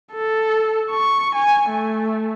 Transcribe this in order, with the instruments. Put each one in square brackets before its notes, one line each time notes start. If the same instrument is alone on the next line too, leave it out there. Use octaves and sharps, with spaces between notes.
[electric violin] A4
C#6
G#5
A3